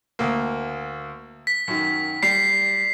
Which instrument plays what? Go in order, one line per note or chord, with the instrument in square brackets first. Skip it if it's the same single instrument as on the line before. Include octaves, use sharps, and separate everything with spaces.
[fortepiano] D2 A#3
[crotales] B6
[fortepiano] F#2 D#3
[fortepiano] G3 [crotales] C7